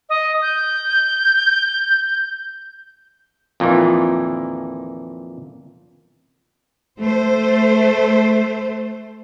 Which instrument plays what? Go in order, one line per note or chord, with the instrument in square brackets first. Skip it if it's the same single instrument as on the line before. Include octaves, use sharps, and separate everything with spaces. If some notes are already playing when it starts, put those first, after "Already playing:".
[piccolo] D#5
G6
[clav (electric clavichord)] F2 A#2 D#3 E3
[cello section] A3 C5